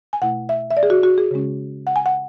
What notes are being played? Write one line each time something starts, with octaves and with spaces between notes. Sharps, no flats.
G#5
B2 A3 E4 F#5
E5
E5
D5
G#4
F#4
F#4
G#4
C#3 G#3 C#4
F#5
G#5
F#5